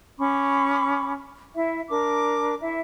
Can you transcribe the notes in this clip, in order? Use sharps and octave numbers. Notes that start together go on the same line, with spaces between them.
C#4 B5 C#6 D6
E4 E5
D4 A#4 D6
E4 E5